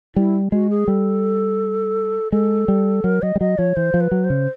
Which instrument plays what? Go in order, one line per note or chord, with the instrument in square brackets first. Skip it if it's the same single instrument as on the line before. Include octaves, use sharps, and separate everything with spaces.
[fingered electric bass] G3 [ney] E4
[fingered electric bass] G#3 [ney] F#4
[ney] G#4
[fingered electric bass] G3 [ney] A4
[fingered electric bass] G#3 [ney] A4
[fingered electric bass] G3
[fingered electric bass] F#3 [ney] A#4
[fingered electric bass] F#3 [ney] D#5
[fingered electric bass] G3
[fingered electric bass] F#3 [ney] D#5
[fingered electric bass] F3 [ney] C#5
[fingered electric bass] E3 [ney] C5
[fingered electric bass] F3
[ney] B4
[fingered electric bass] F#3
[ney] C5
[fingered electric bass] C#3